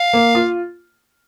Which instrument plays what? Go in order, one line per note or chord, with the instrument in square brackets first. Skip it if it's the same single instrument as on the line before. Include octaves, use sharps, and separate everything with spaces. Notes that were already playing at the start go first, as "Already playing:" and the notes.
Already playing: [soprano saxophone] F5
[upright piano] A#3
F4